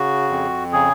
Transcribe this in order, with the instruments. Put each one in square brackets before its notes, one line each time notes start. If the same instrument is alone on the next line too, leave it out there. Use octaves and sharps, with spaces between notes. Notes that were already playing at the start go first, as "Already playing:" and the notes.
Already playing: [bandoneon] C#3 F#4
F2
C#3 G#4